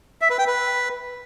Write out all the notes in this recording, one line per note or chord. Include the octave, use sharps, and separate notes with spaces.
E5
B4
G5
B4